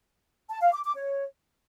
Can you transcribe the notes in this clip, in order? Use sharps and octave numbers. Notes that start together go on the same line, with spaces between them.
A5
F5
D6
D6
C#5